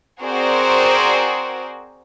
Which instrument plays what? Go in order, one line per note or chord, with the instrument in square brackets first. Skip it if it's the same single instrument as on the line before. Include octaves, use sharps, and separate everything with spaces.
[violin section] C4 F#4 G#4 A#4 C5 D5